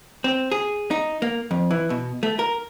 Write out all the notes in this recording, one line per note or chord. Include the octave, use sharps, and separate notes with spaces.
C4
G#4
D#4
A#3
F2
E3
B2
A3
A#4